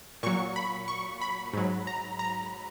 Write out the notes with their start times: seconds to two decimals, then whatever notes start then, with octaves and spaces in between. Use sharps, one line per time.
0.23 A#2 F#3 C#6
0.56 B5
0.88 C#6
1.21 B5
1.53 G#2 F#3
1.87 A#5
2.19 A#5